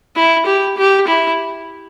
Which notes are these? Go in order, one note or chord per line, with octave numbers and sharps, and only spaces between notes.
E4
G4
G4
E4